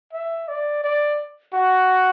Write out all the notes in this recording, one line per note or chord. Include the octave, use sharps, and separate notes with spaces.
E5
D5
D5
F#4